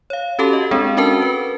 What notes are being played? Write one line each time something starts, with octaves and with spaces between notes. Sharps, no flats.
C#5 F5
C#4 F#4 G4 A4 A5
D#5
G#3 C4 D4 G#4
C#4 D4 F#4 A4 A#4 A5
B4